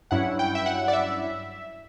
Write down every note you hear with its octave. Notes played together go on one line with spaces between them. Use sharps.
G2 F#3 C#4 E4 F#5
G5
E5
F#5
D5
E5